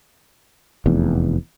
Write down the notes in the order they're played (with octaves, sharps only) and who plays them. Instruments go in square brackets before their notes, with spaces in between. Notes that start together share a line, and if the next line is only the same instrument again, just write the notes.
[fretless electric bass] F1 E2